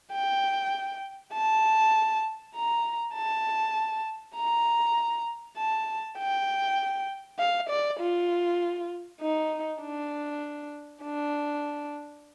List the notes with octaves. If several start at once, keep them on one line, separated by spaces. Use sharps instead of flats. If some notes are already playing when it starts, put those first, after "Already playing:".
G5
A5
A#5
A5
A#5
A5
G5
F5
D5
F4
D#4
D4
D4